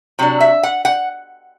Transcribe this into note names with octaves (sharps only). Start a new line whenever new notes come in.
C3 F#3 D4
E5
F#5
F#5